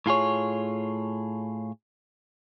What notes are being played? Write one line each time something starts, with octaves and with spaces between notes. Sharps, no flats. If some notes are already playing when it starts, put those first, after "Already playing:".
A2 F4 G#4 C#5